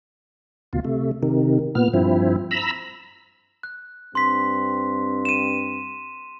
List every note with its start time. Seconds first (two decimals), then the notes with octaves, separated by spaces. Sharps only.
0.73 D2 B2 F4
0.85 C3 A3
1.23 C3 D#3
1.75 A#2 B3 F6
1.93 G2 F3 C4 E4
2.51 A#5 B5 E6
3.63 F#6
4.15 G2 C4 C6 B6
5.25 D#7 E7